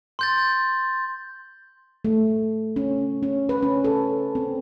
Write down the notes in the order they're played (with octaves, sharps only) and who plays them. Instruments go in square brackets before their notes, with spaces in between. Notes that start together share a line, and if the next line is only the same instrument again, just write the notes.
[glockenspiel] C6 G6 A6
[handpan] A3
C#4
C#4
B4
C#4
A4
C4